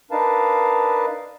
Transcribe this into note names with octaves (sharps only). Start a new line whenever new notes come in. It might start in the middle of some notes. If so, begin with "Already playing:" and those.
D4 D#4 A#4 B4 F5 A5